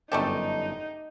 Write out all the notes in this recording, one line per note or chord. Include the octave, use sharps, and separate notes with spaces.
G1 F#2 A3 D4 D#4 G4 A4 D#5